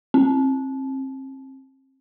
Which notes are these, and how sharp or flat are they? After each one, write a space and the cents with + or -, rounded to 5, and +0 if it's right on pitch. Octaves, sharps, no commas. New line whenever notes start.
C4 +35